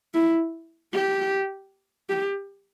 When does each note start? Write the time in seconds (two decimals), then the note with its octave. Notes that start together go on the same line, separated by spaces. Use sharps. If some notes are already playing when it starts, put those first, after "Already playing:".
0.14 E4
0.93 G4
2.09 G4